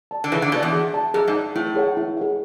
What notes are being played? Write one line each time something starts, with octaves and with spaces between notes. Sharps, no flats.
D5 A5
D3
C#3 E3 G#4
D3
B2 D5 A5
E2
G#4
D5 A5
F#2 G#4
G#2
D5 A5
A2 E4
G#4 C#5 F#5
E4
G#4 C#5 F#5